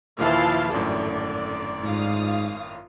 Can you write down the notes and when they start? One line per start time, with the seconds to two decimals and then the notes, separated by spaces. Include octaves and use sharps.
0.19 D#2 A#2 E3 F3 E4 F5 A5 C6
0.73 G#1 F#2 A2 D3 D5
1.84 G#2 F4 F5 D#6